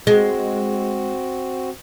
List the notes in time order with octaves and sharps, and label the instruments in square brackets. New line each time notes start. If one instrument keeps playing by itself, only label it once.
[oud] G#3 [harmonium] C4 F#4